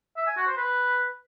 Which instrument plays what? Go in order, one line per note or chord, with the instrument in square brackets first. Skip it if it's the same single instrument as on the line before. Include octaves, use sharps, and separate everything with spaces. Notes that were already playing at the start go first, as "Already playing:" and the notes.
[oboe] E5
G#5
F#4
C5
B4